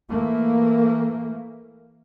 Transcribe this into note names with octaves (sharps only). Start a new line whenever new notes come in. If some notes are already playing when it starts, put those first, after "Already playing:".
E3 A3 A#3